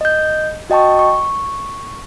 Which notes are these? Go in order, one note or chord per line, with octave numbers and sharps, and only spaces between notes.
D#5 G6
F#4 D#5 G5 A5 C#6
C#6